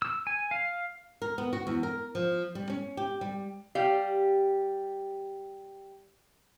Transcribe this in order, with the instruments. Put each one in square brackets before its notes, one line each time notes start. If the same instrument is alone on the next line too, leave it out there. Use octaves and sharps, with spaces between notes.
[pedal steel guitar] E6
G#5
F5
[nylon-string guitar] A#4
B3
F#4
E2
A#4
F3
G3
C#4
G4
G3
[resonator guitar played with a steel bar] G3 G4 F5